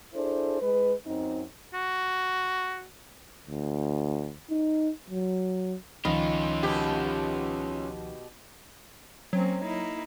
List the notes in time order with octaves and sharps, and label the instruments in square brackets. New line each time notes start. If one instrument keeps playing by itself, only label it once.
[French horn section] D4 E4 G#4 A4 C5
G#3 B4
F#2 C4 D#4
[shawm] F#4
[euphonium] D2
D#4
F#3
[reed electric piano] C#2 F3 B5 [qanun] D#3 [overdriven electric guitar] C#4 F4
[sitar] B2 G4
[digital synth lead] F#3 [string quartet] A#3 C4 C#4
[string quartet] A#3 D#4 E4